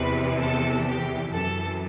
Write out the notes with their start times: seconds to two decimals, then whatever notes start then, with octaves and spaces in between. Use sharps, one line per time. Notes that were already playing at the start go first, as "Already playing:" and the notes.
Already playing: E2 C3 E3 B4
0.40 A4
0.87 G4
1.32 F#2 E3 A4